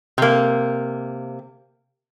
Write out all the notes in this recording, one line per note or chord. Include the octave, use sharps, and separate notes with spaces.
C3 A#3